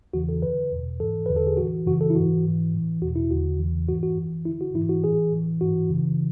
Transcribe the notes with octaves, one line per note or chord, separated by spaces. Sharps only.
E2 C#3 E3 F#4
A4
F#2 D3 B4
E2 B2
G#2 E3 A4
E2 D3 B4
A4
G#4
A2 E3 F#4
F#2 C#3 E3 F#4
A4
E4
G#2 E3 F#4
G#2 E3
A2 E3
E2 B2 F#4
E4
E2 D3 F#4
E2 C#3 E3
G#2 E3 F#4
F#4
F#2 E3
F#2 D3 E4
F#4
G#2 E3 E4
F#4
A2 E3 G#4
A2 E3
G#2 E3 F#4
F#2 C#3 E3